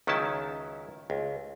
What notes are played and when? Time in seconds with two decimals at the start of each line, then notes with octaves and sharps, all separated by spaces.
0.07 C#2 D#3 F#3 C#4 E4 A5
1.10 C#2